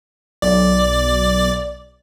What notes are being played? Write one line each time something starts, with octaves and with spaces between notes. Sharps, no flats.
B1 D5